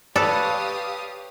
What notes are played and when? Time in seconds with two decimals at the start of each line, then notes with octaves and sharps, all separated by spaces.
0.16 G4 A4 B4 C#5 D5 F5 D#6 F#6